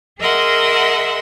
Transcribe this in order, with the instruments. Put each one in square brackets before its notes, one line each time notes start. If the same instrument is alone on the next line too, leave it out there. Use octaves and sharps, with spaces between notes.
[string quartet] G#4 A#4 D#5 E5 F#5 C6